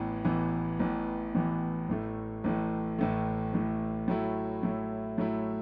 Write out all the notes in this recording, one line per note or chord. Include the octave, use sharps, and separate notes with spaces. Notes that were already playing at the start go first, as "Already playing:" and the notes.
Already playing: A1 A2 E3 B3
A1 A2 E3 B3
A1 A2 E3 B3
A1 A2 E3 B3
A1 A2 A3
A1 A2 A3
A1 A2 A3
A1 A2 A3
A2 F#3 A3 E4
A2 F#3 A3 E4
A2 F#3 A3 E4